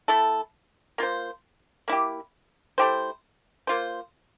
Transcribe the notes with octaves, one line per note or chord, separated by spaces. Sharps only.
A3 E4 A4
A#3 F4 C5
A#3 E4 G4
A3 E4 G4 C5
A#3 F4 C5